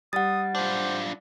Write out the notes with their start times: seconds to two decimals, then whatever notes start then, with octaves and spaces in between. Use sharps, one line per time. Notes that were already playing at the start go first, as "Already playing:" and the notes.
0.13 G3 F#5 D#6 A6
0.55 D4 F4 C5